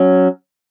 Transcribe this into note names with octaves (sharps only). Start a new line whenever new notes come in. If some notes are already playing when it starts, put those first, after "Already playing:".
Already playing: F#3 C#4